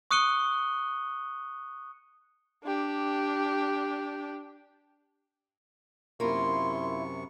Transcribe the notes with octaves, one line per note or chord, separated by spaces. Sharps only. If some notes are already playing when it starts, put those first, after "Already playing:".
C#6 D#6 F#6 C#7 D#7 G7
D4 G4
F#2 C3 A#3 E4 F4 C6 C#6